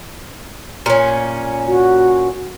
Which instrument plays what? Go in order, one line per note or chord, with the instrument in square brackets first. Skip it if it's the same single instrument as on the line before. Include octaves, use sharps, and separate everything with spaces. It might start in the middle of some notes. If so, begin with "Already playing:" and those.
[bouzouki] A#2 C#4
[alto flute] F#4